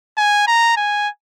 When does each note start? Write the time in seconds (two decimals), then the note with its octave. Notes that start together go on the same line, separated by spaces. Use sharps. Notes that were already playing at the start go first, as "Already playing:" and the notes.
0.17 G#5
0.47 A#5
0.77 G#5